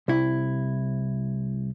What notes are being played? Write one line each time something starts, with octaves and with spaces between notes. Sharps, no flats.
C2 E4